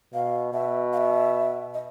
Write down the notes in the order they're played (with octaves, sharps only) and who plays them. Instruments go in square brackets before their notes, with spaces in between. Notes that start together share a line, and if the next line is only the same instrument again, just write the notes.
[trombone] B2 [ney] F5
[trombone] B2 [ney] E5
[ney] F5
E5
D#5